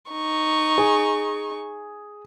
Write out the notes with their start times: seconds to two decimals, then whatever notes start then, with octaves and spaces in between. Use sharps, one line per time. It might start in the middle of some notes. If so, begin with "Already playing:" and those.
0.11 D#4 C#6
0.78 G#4